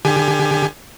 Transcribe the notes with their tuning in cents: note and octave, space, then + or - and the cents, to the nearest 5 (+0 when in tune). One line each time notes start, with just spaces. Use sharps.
D3 +15 G4 +30 G#5 +25